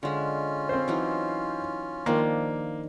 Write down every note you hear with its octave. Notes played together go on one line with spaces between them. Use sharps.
D3 G#3 C#4 F4
C4 C5
E3 F#3 D#4
D#3 F3 A#3 D4